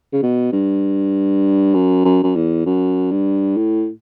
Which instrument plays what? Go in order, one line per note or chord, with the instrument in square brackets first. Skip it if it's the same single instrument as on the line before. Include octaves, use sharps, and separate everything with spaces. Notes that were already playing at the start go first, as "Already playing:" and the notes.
[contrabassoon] C#3
B2
G2
F#2
F#2
F#2
E2
F#2
G2
A2